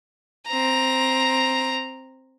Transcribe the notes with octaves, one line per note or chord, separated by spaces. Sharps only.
C4 A#5